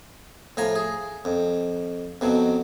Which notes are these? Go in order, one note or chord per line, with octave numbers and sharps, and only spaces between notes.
A2 F3 G#5 A#5
G#4
F2
F2 B2 F#3